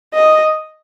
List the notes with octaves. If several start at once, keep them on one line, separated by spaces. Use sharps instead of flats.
D#5